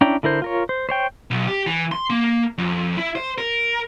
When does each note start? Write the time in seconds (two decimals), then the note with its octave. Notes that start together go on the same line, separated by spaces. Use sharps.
0.01 C#4 D4 E4 G5 A#5
0.23 D3 E4 A#4 C5
0.42 F4 A#4 C#5
0.69 C5
0.89 C5 C#5 G5
1.31 B1
1.47 G4
1.67 E3
1.92 C6
2.10 A#3
2.58 F2
2.97 E4
3.15 C5
3.38 A#4